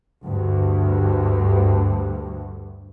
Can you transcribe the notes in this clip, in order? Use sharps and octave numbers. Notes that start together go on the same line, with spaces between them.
D2 G2